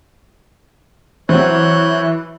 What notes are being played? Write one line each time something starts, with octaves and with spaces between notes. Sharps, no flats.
E3 F#3 C4 C#5 F#6 G6